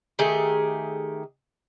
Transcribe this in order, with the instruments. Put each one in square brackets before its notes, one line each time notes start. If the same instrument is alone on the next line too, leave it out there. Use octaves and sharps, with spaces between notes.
[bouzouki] D#3 A3 G4 G#4